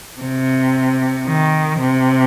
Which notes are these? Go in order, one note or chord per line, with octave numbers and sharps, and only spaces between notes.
C3
D#3
C3